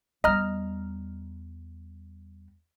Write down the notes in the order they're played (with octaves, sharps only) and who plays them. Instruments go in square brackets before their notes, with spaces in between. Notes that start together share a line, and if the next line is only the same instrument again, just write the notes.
[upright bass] E2 G3 [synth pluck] D#5 A#5 F6